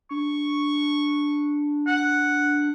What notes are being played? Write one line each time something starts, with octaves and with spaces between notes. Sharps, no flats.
D4 C#6
F#5